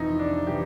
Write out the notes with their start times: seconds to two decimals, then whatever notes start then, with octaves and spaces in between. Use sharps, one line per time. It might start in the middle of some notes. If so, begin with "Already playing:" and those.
Already playing: F2 C3 E3 D#4 E4
0.19 D4
0.47 C3 E3 G4